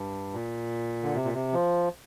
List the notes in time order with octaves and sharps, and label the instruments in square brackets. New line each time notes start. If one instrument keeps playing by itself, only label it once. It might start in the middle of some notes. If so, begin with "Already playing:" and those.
Already playing: [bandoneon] G2
A#2
D3
C3
A#2
C3
F3